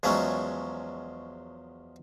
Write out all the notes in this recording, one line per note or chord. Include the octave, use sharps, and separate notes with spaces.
E2 F3 F#3 G#3 C#4